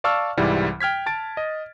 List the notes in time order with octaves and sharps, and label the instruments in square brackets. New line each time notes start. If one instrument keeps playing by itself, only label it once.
[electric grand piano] D5 F5 A5 C#6 E6 F6
C2 G#2 E3 G3 E4
G5 F6 G#6 B6
A5 A6 D7
D#5